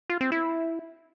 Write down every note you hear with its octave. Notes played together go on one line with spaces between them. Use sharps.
F4
C4
E4